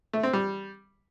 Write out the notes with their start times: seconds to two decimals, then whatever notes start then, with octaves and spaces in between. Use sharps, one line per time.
0.13 A3
0.23 C4
0.33 G3